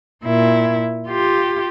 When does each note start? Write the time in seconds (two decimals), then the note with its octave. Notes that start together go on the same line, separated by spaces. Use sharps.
0.24 A#2 E4
1.08 F4 G4